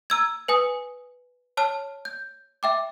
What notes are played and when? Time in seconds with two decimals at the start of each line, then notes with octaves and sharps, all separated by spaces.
0.10 A#5 E6 G#6
0.48 B4 G#5 D#6
1.57 C#5 A5 F6
2.05 G6
2.63 E5 G5 D6